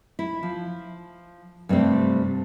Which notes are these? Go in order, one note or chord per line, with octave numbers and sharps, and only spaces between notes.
E4
F3
G2 C3 A3 C4 D4